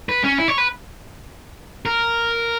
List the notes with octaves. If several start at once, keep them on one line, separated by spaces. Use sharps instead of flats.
B4
C#4
E4
C#5
B4
A#4